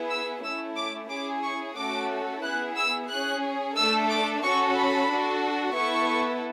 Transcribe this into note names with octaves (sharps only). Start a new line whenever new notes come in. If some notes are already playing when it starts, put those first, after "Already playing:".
Already playing: B3 E4 G#4
E6
A3 C#4 E4 E6
D6
C#4 E4 G#4 D6
C#6
A3 C#4 F#4 A4 D6
B3 E4 G#4 F#6
E6
C#4 G#4 F#6
A3 D4 A4 E6
D6
C#4 F#4 A4 C#6
B5
D4 F#4 A4
B3 E4 A4 C#6